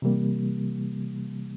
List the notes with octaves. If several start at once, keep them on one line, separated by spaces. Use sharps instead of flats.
C3 E3 G3 A#3